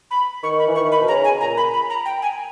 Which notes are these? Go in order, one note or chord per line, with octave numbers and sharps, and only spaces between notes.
B5
D#3 C#6
B5
E3
D#3 C#6
B5
B2
C#3 A#5
G#5
A#2 A#5
B5
B5
A#5
G5
G#5